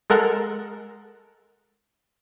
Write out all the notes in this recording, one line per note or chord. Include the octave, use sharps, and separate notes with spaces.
G#3 A4 A#4 F#5